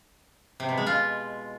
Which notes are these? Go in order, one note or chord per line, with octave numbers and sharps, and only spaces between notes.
C3
B2
G#3
F4